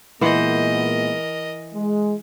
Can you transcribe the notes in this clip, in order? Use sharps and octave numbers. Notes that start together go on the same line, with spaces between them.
A#2 E3 G#3 B3 A#4 C5 D#5 F#5
G#3